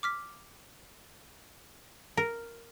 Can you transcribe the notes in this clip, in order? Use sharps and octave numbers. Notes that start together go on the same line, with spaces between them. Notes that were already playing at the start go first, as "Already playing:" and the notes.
D6 F6 B6
A#4